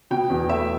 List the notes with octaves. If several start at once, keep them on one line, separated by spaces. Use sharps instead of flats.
B2 G5
E2
A3 E5